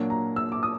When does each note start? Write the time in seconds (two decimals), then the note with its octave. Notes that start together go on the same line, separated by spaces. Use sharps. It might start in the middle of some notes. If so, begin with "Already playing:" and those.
Already playing: A#2 F#3 A#3 D4
0.10 A#5
0.36 E6
0.52 D6
0.63 D#6